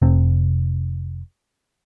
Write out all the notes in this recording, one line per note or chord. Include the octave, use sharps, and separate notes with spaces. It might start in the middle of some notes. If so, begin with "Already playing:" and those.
F1 C3 C4